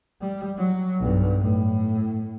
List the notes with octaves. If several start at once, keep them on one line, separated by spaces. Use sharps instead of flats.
G3
F#3
B1 G2
A2